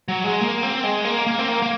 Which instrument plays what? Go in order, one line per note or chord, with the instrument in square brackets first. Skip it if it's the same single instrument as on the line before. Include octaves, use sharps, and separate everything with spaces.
[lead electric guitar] F#3
G#3
A#3
C4
G#3
A#3
A#3
C4
A#3
A#3